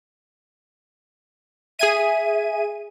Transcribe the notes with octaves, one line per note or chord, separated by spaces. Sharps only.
G#4 E5 G#5 D#7